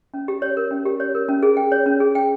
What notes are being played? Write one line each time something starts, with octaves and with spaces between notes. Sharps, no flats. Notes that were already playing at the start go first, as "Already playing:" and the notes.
C#4
G4
C#5
A#4
C#4
G4
C#5
A#4
C#4
G#4
G5
C#5
C#4
G#4
G5